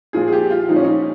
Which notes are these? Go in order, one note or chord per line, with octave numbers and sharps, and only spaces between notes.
A#2 F3 G#4
G#4
G4
F4
A#2 F3 D#4
C#4
D#4